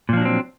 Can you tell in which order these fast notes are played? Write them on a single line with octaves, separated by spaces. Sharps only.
A#2 F3 D4 F#3 C4